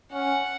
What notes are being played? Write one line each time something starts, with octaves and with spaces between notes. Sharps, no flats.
C#4 F#5